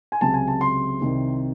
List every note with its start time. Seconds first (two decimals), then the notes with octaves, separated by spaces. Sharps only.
0.12 G#5
0.21 C#2 C3 F#3 A5
0.34 G#5
0.48 A5
0.61 C6
1.01 C2 C3 D#3